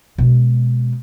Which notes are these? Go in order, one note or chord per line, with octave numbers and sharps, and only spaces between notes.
B2 G#3